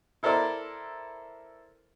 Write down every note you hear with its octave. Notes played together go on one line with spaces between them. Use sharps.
E4 A4 A#4 C5 D5